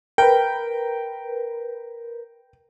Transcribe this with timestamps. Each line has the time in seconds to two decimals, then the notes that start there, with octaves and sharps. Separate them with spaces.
0.18 A#4 B4 G5